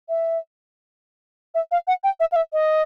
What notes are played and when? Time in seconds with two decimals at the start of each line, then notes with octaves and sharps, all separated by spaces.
0.09 E5
1.54 E5
1.71 F5
1.87 F#5
2.04 G5
2.20 E5
2.32 F5
2.36 E5
2.53 D#5